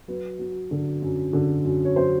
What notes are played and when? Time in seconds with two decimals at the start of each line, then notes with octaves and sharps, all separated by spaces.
0.08 F#3 B4
0.39 F#3
0.71 D3
1.02 F#2
1.33 D3
1.65 F#2
1.85 C#5
1.96 F#3 C5